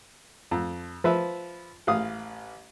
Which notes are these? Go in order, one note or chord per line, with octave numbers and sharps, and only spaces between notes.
F2
F3 B4 E5
A1 F5 D#6